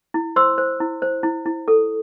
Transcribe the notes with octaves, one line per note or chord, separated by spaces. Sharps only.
E4
C5 C6 E6
C5
E4
C5
E4
E4
A4